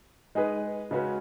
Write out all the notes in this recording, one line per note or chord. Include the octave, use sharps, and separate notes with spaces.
G#3 D#4 G#4 B4
C#3 G#3 C#4 F#4 B4